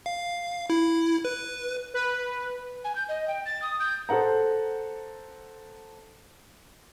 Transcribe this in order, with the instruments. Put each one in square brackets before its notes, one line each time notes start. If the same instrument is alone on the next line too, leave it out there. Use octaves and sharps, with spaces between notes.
[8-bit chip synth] F5
E4
B4
[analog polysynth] B4
[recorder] G#5
G6
D#5
G5
A6
D#6
G6
[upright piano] A4 C5 F#5 A#5